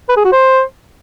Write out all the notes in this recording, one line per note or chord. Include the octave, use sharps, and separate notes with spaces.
B4
G#4
F#4
C5